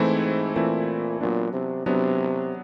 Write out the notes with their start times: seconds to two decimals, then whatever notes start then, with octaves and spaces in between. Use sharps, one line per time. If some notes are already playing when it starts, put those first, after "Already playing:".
Already playing: G#2 E3 A3 C4 E4
0.56 A#2 E3 A3 C4 E4
1.21 A#2 F#3 B3 D4
1.53 C3
1.86 C3 F#3 B3 D4